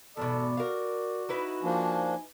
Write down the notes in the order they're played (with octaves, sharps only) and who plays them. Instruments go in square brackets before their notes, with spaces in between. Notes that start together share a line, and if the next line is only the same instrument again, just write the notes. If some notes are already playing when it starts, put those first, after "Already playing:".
[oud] E2 G#2 B2 [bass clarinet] A4 [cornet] D5
[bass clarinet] F#4 [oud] A#4 F5
[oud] D#4 E4 B4
[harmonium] F3 A#3 D4 [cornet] G#5